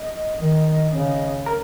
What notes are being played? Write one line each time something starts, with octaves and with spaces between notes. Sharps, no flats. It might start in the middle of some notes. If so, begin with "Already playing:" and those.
Already playing: D#5
D#3
C#3
A#4